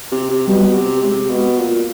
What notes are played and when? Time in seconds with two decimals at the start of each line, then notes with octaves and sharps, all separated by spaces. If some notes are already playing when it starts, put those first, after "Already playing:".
0.11 C3
0.30 C3
0.48 B2 G3
0.75 C3
1.03 C3 G#3
1.30 B2
1.57 A#2